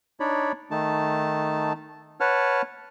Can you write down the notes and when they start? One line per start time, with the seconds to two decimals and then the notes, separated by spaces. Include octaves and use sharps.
0.20 D4 D#4 C#5 D5 B5
0.71 D#3 A3 D#4 A5
2.20 B4 C#5 F#5 A5 F6